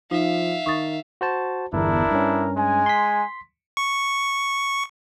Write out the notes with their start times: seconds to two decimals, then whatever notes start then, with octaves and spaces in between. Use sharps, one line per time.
0.11 F3 D#4 E5 F5
0.66 D#3 C#6 D#6 A6
1.21 F#4 C5 A5
1.73 G1 E2 D4 E4 A#4
2.11 G2 C#4
2.56 G#3 G#5
2.86 C6 B6
3.77 C#6